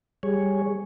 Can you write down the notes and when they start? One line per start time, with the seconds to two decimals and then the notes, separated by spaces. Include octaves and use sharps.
0.23 G3 G#4 C#5